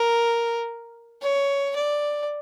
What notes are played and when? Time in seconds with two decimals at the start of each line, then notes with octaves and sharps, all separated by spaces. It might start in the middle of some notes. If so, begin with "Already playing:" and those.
Already playing: A#4
1.22 C#5
1.77 D5